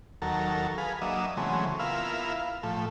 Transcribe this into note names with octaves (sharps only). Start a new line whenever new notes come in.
D#2 F#3 A4 A#4
G#4 B4 F5
F#3 A#3 D4 D#5 E5
C#3 E3 F#3 G#3 A3 C4
B3 E4 F4 A#4 E5 F5
A2 F3 A3